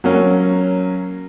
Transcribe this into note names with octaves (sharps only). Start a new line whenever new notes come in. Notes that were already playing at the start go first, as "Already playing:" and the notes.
F#3 A#3 C#4